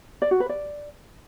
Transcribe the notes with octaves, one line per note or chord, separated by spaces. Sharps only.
D5
F#4
B4
D5